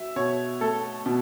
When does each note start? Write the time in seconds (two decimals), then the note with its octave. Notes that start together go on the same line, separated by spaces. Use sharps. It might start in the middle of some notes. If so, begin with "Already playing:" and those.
Already playing: F#3 E5
0.16 B2 C#5
0.61 A3 A4
1.06 B2